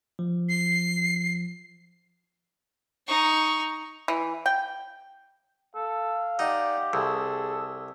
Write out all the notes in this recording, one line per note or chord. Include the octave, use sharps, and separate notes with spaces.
F3
C7
D#4 C#6
E3
G5
A4 F5
D#4 G4 D5 F#5
C2 G#4 A4